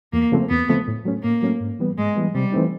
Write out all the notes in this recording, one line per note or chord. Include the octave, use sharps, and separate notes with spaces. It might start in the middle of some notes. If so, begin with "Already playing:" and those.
E2 A#3
C#3 F3 A3 C4
E2 B3
C#3 F3 A3 C4
A2
F#3 A3 C#4
A2 A#3
F#3 A3 C#4
G#2
E3 G3 B3
G#2 G#3
E3 G3 B3
C3 G3
E3 A3 C4 D#4